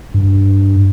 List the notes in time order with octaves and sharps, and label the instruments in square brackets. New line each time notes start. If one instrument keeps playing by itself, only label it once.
[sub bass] G2